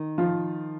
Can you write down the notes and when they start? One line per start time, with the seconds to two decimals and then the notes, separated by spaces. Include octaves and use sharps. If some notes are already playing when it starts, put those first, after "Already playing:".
Already playing: D#3
0.18 F3 F4